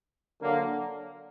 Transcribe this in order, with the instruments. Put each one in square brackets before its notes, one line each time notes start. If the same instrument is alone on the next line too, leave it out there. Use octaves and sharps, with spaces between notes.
[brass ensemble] D3 F#3 A#3